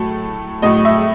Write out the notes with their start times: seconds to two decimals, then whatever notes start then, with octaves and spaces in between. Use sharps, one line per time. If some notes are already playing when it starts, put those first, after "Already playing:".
Already playing: A2 F#3 A3 A4
0.62 A2 F#3 A3 D#5
0.85 E5